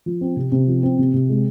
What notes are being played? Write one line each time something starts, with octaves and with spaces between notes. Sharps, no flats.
F3
C4
C3
C3
F3
C4
C3
C3
G#3